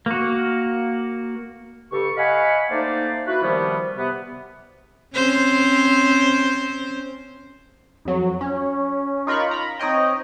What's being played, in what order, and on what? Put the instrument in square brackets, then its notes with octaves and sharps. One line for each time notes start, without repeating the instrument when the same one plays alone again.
[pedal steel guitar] A#3 F#4
[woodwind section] G2 C#3 G4 A4 C#6
D#5 F5 F#5 G#5 B5 C#6
A3 A#3 D#4 C5 D5
E4 F#4 B4
C3 D#3 F3 G3 A#3 B3
C3 B3
[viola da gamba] C4 C#4 C5
[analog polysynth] F2 F#3
C#4
D#4 F4 A#4 B5 C#6
A#5 B5
C4 D#4 C#5 D#5 G5